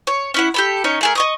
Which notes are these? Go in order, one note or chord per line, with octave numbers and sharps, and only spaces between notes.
C#5
C#4 E4 F#5
G4 A4 B5
C#4 D#4 C#5
A3 G#4 A#4
D#5 C#6 D#6